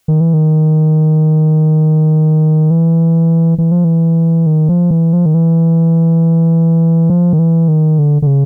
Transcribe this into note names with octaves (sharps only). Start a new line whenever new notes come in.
D#3
E3
D#3
E3
E3
F3
E3
D#3
F3
E3
F3
D#3
E3
F3
D#3
E3
D#3
D3
D3
C#3